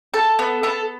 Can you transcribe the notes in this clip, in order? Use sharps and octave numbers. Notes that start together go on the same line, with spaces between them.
A4 A5
B3
B3 A4